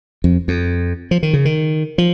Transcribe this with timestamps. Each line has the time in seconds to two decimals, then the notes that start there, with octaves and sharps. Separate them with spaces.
0.24 F2
0.48 F2
1.11 F3
1.23 D#3
1.33 C#3
1.45 D#3
1.98 F3